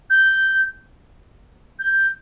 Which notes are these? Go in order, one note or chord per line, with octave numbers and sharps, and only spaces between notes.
G6
G6